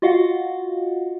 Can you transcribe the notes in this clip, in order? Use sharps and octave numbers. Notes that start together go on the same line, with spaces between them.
F4 F#4 D#5 F5 F#5